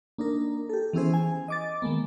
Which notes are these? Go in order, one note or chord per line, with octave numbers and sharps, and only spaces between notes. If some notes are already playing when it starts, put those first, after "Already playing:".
A#3 D4 D#4 A#4
G4 A4
E3 B3 C#4 E4 G#4 C5
G#5
D#5 D6 A6
D#3 G#3 A#3 B3